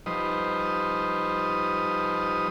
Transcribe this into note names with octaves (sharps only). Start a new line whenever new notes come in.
F3 G3 D#4 B4 C5 D#5